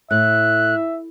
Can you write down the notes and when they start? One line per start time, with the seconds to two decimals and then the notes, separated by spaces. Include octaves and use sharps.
0.11 A2 E5 F#6